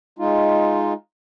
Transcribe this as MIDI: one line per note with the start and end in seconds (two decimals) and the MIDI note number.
0.19 0.93 56
0.19 0.93 63
0.19 0.93 65